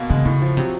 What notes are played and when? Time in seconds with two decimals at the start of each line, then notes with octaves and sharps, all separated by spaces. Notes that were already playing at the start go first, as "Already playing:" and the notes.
Already playing: B2 A#3
0.10 C#3 G#3
0.25 A2 C#3
0.42 F3
0.57 C3 F#3